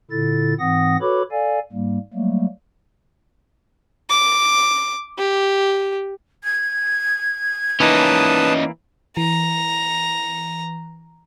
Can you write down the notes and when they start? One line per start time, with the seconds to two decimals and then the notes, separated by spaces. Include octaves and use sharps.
0.11 A#2 D3 E4 A4 A6
0.59 G#2 E3 C4 F#5 D#6 A#6
1.01 F#4 A4 B4 C#5 B5 D6
1.31 A4 D5 F5 G#5
1.72 G#2 G3 A#3
2.14 F#3 G3 A3 A#3
4.10 D6
5.18 G4
6.43 G#6
7.80 E3 A#3 C#4 D#4 B4 A5 D#6
9.17 E3 A#5